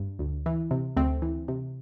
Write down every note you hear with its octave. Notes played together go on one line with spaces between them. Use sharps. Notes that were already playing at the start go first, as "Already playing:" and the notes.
Already playing: G2
D2
E3
C3
D2 A3 C4
E3
C3